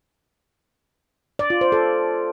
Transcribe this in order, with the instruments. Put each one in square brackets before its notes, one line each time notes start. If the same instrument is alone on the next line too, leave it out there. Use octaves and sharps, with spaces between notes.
[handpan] D5
F4
C5
A4